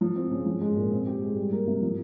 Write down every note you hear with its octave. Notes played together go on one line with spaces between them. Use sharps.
F3
C4
C#3
F3
G#3
A#2
C4
G4
G#3
G3
A#3
C3
F3